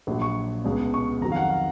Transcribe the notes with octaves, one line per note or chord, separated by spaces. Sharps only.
A#1 A#2 F#3
C#6
C#2 B2 G#3
C#6
F2 D#3 F#3 A#5
F5
F#5
F5